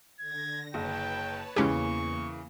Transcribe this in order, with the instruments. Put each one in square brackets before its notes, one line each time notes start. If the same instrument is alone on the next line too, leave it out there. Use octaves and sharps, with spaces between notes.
[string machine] D3 A#6 [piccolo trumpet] G#6
[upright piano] F#1 [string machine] B4 C#5 A5 [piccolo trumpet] G5
[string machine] E2 A#3 [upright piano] C#3 E3 [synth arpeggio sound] G#3 C#4 G4 [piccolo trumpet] C#6